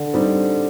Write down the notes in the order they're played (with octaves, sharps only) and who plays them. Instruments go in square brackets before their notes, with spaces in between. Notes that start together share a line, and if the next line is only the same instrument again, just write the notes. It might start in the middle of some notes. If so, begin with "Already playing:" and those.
Already playing: [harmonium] D3
[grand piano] G3 C4 D#4